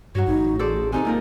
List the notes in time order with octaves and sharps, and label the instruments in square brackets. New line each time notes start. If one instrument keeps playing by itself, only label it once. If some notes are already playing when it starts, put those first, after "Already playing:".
[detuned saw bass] G2 [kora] F#3 C#5 [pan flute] F#4
[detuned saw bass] A1 [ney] D#4
[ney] G#4 [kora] A4 C5 D5
[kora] C3 D#4 A4 [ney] C4 [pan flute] G#5
[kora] G#2 F3 A#4 [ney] A#3